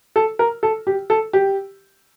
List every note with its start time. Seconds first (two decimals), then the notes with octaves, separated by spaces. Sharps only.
0.16 A4
0.39 A#4
0.63 A4
0.87 G4
1.10 A4
1.33 G4